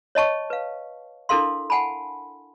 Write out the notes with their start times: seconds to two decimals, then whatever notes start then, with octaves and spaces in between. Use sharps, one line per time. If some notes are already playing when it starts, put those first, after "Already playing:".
0.15 C#5 D#5 A5 C#6
0.50 B4 F5
1.29 D4 E4 A4 A#4 F5 C6
1.70 F#5 G#5 A5 B5